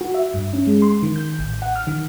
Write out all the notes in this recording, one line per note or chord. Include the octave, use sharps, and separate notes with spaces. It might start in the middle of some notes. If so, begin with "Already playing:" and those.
F#4
E5
G2
C#4
G#3
C6
D#3
G6
A1
F#5
F6
D#3